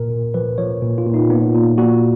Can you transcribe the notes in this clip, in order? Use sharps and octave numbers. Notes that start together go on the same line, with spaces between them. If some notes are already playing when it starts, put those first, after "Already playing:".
Already playing: A#2 A#4
A#2
F3 B4
F3 C#5
A#2
F4
A#2
D#4
A#2 B3
A#2
A#2 F#4